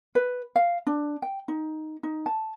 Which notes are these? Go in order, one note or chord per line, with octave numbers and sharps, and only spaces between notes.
B4
F5
D4
G5
D#4
D#4
A5